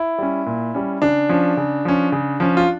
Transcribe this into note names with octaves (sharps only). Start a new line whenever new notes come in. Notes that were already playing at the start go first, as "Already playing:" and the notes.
Already playing: E4
G3 C#4
A#2
G3 C#4
C#3 D4
F3 C#4
C#3
F3 C#4
C#3
F3 C#4
F4